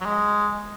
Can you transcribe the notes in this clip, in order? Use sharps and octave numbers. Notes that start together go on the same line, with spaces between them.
F#3
G#3